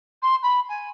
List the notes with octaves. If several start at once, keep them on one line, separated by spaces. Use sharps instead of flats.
C6
B5
G#5